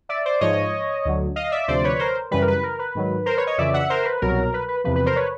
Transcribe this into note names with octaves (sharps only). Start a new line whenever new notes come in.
D5 E5
C5 D5
G#2 F3 C#5 D#5
D2 D3 F#3
D#5 F5
D5 E5
D2 C3 F3 C5 D5
B4 C#5
C#5
A#4 C5
F#2 C#3 E3 G3 B4
A#4
B4
A#4
B4
G#2 D#3 F#3
A#4 C5
B4 C#5
C#5 D#5
F2 C#3 E3 D5 E5
E5 F#5
A#4 C5
B4
C2 B2 F#3 A#4
B4
B4
E2 C3 F3 B4
B4
A#4 C5
B4 C#5